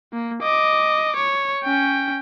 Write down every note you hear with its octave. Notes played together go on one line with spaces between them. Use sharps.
A#3
D#5 D6
C#5
C#4 G5